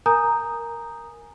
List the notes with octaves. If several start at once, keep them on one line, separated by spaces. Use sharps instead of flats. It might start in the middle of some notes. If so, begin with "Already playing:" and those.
A#4 G#5 A#5 D#6 G6